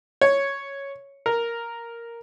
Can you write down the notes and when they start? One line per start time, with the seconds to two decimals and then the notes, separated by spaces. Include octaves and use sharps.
0.21 C#5
1.26 A#4